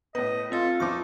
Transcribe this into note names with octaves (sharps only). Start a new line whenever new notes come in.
A2 B3 B4 D#5
C4 F4 A4 D#5
E2 F3 D#4 C#6 D6